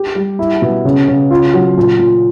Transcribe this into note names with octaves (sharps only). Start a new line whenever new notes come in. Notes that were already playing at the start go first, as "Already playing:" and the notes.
Already playing: G4
G3
E4
B2
C#3
C#3
F4
F#3
A#2
A#2